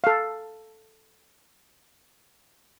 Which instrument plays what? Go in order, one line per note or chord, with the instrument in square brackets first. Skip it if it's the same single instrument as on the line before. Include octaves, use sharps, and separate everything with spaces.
[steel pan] A4 F5